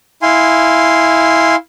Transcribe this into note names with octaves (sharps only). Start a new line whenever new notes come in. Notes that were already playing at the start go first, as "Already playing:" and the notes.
E4 F5 G#5 C6